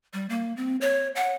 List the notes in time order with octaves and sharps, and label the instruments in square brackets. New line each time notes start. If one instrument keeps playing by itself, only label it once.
[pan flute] G3
A#3
C4
C#5
F#5